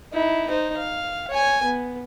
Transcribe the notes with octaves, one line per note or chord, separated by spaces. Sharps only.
D#4 E4
D#4 C5
F5
C#5 G#5
B3